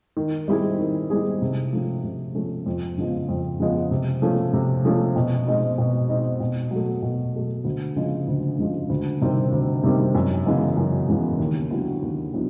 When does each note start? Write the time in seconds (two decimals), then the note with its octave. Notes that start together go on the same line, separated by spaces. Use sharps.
0.17 D#3
0.48 G3 C4 E4 G#4
0.79 D#3
1.10 G3 C4 E4 G#4
1.42 C3
1.73 F3 A3 C#4
2.04 C3
2.35 F3 A3 C#4
2.66 F2
2.98 C#3 F3 G#3 B3
3.28 F2
3.59 C#3 F3 G#3 B3
3.91 C3
4.22 F3 A3 C#4
4.53 C3
4.85 F3 A3 C#4
5.16 B2
5.47 G#3 C4 D#4
5.78 B2
6.09 G#3 C4 D#4
6.40 B2
6.71 F#3 A3
7.02 B2
7.34 F#3 A3
7.65 D2
7.96 C#3 F3 G#3
8.27 D2
8.59 C#3 F3 G#3
8.90 D2
9.21 C3 D#3 G3 C4
9.52 D2
9.83 C3 D#3 G3 C4
10.15 F#2
10.46 C#3 E3 G#3 B3
10.77 F#2
11.08 C#3 E3 G#3 B3
11.39 D#2
11.71 D3 F#3 B3 E4
12.02 D#2
12.33 D3 F#3 B3 E4